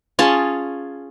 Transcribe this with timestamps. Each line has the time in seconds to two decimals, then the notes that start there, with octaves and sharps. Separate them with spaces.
0.19 C#4 F4 G#4 A5